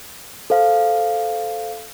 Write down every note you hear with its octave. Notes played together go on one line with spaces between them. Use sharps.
A4 C5 F5